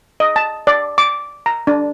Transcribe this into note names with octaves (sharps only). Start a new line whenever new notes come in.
D#5
A5
D5
D6
A#5
D4